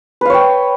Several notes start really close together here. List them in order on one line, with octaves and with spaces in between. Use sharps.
B4 F5 C#5 G5